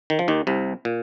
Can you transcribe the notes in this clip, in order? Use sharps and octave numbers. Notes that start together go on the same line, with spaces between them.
D#3
F3
D#2 D#3
C2 C3
A#2